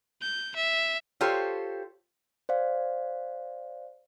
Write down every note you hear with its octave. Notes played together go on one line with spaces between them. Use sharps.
G6
E5
F4 G4 A4 C5 C#5
C5 D5 F5